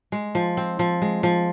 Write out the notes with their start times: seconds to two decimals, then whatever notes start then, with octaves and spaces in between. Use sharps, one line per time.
0.12 G#3
0.35 F3
0.57 C4
0.79 F3
1.02 G#3
1.23 F3